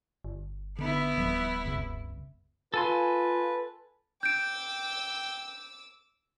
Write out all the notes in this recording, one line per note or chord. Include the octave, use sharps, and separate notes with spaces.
G1
D3 B3 E4
D1 F3 G3
C2 F#2 C#3
F4 A4 B4 G#5 C6
G5 D6 E6 G6 D7